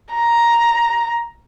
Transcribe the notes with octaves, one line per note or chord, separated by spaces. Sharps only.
A#5